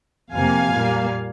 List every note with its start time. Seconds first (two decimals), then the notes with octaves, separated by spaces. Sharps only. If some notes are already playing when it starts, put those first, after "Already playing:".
0.32 F2 C3 F3 A#3 F5 G#5
0.73 A#2 G3 A#3